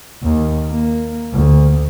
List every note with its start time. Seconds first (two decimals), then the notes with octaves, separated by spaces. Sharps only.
0.23 D#2
0.69 A#3
1.32 D2